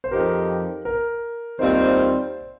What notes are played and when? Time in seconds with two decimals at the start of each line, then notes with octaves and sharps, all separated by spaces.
0.04 C5
0.11 F2 F3 D#4 G4 A#4
0.85 A#4
1.59 D#2 D#3 G3 C4 F4 C5